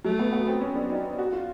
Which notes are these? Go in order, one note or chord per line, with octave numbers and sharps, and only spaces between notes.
F#3 A3
B3
B3
C4
C#4
D4
D#4
F#4
F4